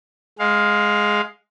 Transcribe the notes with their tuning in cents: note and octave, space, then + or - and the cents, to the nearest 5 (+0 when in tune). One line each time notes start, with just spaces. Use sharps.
G#3 +5 F5 +15